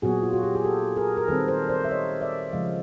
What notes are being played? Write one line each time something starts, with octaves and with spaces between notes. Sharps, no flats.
A#2 F#3 B3 F#4 G#4
F4
F#4
G4
G#4
G4 A4
G#4 A#4
A#4
D#3 G3 C4 A4 B4
A#4 C5
C5 D5
E5
C#5 D#5
D5 E5
C#3 F3 G#3 D#5 F5